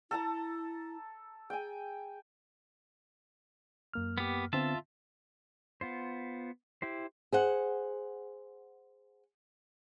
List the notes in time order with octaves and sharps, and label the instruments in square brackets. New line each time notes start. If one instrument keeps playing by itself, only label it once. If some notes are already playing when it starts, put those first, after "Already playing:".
[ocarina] E4 [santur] A4 A5 A#5
[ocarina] G#4 [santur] G5 G#5
[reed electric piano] F#2 A#3 F6
[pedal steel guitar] B3 G4
[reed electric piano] D3 B3 C4 [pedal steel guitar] F4 E5 A5
[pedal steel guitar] B3 F4 C5
E4 G4 C5
[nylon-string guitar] G#4 C5 F#5